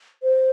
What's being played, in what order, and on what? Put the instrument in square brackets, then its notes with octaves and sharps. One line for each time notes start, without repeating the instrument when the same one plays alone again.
[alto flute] C5